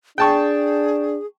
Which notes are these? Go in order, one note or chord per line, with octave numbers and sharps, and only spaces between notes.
D4 G#4 G5 A5 C#6